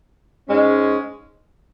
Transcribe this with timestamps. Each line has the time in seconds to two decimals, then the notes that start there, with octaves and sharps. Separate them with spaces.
0.47 G#2 G#3 C#4